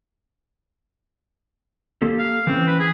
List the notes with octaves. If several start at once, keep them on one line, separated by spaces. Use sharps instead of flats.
A#3 G4 A4
F5
E3 C4 C#4
B4
G#4